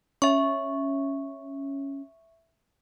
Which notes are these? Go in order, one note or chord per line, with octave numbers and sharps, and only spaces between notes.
C#4 E5 C#6